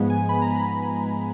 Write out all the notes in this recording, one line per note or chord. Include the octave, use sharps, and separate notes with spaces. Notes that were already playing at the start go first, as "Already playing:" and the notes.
Already playing: G#2 F3 G#3 B3
G#5
B5
A#5
B5